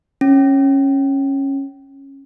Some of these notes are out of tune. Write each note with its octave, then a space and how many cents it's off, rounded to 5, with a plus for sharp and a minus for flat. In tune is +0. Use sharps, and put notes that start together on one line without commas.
C#4 -15